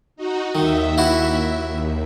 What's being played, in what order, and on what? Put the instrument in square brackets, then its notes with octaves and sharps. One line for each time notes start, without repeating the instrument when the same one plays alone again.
[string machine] D#4 F#4
[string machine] D#2 E5 [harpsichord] D#3
[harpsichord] E4 F#4
[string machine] D#2